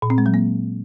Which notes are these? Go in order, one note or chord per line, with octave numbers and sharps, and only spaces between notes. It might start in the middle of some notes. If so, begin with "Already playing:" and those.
A#2
C4
G#3
F#3
A#3